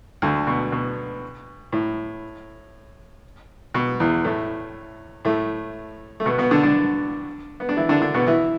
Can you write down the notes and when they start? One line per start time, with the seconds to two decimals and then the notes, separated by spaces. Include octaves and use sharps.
0.22 D2 D3
0.47 B2
0.72 B2
1.73 A2
3.74 B2
4.00 E2 E3
4.24 A2 A3
5.25 A2 A3
6.20 A3
6.26 B2 B3
6.38 B2 B3
6.51 D3 D4
6.63 D3 D4
7.60 B3
7.69 D4
7.77 E3 E4
7.89 D3 D4
8.01 D3 D4
8.14 B2 B3
8.27 E3 E4